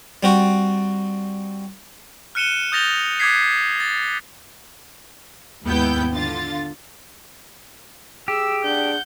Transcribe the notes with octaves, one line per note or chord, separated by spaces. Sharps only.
G3 C4 F#4
F6 F#6 C#7 D#7 E7 G7
D#6 G6 A6 A#6 F7 G7
D6 D#6 F#6 G#6 B6 C7
A6
D#2 G#2 B3 E4 G5 G6
D3 F4 A6
G4 G#4 E6
D4 F#5 G6